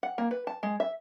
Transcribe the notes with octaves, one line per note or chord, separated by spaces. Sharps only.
F#5
A#3
B4
A5
G#3
E5